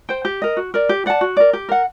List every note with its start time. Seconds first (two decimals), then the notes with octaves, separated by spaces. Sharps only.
0.09 C5 G5
0.25 G4
0.42 A#4 D#5
0.57 F#4
0.74 A#4 D5
0.89 G4
1.06 D5 F#5 A5
1.21 F#4
1.37 A#4 D5
1.53 G4
1.69 A#4 F#5